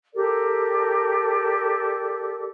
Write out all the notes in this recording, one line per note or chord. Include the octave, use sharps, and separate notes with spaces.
G4 A4 A#4 D5